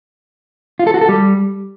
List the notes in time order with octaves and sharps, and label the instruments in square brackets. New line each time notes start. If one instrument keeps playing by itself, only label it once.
[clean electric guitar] F4
A4
F#4
A4
G3